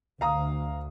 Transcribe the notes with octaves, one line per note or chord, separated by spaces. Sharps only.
D2 F5 A#5 D#6